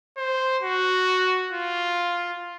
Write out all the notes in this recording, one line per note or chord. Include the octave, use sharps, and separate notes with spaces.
C5
F#4
F4